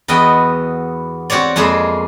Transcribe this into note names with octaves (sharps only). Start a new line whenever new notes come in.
E2 B3 F#4 D#5 G5
C4 F#4 G4 C#5 D5
F2 G#3 A#3 G#4 E5 B5